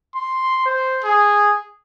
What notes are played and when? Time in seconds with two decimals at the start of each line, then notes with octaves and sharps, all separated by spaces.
0.15 C6
0.65 C5
1.04 G#4